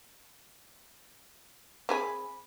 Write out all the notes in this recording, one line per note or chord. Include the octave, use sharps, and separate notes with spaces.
C4 G#4 G#5 B5 D6